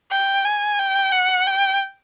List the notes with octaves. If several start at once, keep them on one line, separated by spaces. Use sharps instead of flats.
G5
G#5
G5
F#5
G5